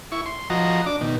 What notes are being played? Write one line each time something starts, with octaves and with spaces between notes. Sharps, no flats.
E4 C#6
C6
F3 F#4 D#5 A#5 C6
D4 D6
B2 D#3